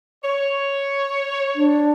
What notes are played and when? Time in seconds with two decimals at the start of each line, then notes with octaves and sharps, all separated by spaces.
0.23 C#5
1.56 D4